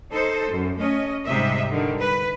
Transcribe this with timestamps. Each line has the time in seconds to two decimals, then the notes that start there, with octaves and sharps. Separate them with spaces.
0.12 D#4 A4 C5
0.49 F#2
0.78 A3 C#4 D#5
1.24 G#2 C3 G3 D#5 E5
1.70 D3 D#3 G3
2.01 B4